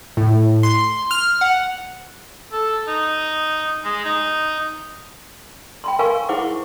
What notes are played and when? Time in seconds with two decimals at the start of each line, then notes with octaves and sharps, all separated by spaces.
0.17 A2
0.63 C6
1.11 F6
1.41 F#5
2.52 A4
2.88 D#4
3.85 G#3
4.05 D#4
5.84 G5 B5 C6
5.99 A#4 F5 G#5 C#6
6.29 E4 G#4 C5 F#5 C#6 D6